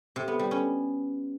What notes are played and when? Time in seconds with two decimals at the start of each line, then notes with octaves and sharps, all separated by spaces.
0.16 C3
0.28 B3
0.39 G3
0.51 C#4